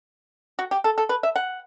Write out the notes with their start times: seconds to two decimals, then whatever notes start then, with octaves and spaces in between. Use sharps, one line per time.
0.59 F#4
0.71 G4
0.84 A4
0.98 A4
1.09 B4
1.23 E5
1.36 F#5